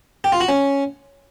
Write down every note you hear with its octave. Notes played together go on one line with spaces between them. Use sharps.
G4
F4
F#4
C#4